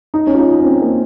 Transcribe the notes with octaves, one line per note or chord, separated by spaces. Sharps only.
D#4
C#4
F4
D#4
D#4
C#4
C4
A#3